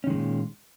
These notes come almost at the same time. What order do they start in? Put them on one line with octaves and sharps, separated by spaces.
C#4 D#3 G#3 A#2